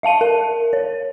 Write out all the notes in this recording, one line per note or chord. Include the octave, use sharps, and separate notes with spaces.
E5 F5 A5 D#7
A#4
C#5